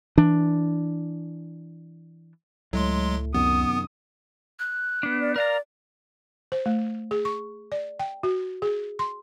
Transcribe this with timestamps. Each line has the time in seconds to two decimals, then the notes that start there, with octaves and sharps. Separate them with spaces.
0.18 E3 D4
2.73 C#2 A2 F#3 G#3 C6
3.34 F#2 C3 D#3 B3 D#6
4.59 F#6
5.03 B3 D4
5.20 D5
5.36 A#4 D5 F5 A#5
6.52 C5
6.66 A3
7.11 G#4
7.25 C#6
7.72 D5
8.00 G5
8.23 F#4
8.62 G#4
8.99 C6